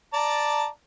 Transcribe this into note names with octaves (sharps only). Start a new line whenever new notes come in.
D5 A5 A#5